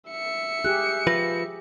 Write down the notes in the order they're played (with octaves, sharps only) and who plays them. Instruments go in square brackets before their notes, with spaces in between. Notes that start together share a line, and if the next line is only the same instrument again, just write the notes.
[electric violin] E5 C#7
[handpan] G4 G#4 [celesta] F#6
[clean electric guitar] F3 F4 B4 [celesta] A#6